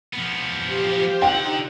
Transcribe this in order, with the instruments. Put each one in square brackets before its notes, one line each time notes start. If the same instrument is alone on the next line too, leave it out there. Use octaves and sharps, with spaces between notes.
[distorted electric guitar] F3 B3
[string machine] F4 G4 C5
[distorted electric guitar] D3 F#5 [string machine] D#4 [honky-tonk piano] G5